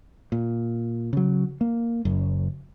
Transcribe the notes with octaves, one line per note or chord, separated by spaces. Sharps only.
A#2
C#3 F#3
A#3
F#1 F#2